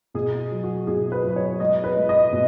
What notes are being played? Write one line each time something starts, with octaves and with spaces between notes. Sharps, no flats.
B2 G#4
F#3
F#4
B2 G#4
B4
F#3 B4
C#5
G#3 D#5
B4
G#3
D#5
B2